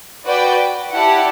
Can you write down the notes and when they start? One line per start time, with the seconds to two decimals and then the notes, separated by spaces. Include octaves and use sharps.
0.23 F#4 B4 D5 G5
0.94 E4 G4 D5 F#5 A5